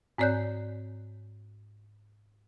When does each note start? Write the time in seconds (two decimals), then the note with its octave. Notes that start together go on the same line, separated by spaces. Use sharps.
0.18 G#2 C4 C#5 D5 F#6 G6